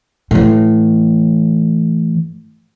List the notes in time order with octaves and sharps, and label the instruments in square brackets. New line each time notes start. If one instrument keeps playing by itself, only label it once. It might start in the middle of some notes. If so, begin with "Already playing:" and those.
[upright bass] A2 E3